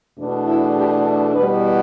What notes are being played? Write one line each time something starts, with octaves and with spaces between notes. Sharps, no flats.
E2 B2 A3 D4
E4
G4
E2 B2 G3 B4